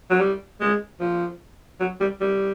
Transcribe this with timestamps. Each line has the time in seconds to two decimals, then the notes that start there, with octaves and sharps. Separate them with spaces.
0.10 F#3
0.20 G3
0.60 G#3
1.00 F3
1.80 F#3
2.00 G3
2.21 G3